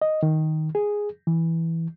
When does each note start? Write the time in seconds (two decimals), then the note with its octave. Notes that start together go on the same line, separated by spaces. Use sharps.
0.02 D#5
0.23 D#3
0.75 G#4
1.27 E3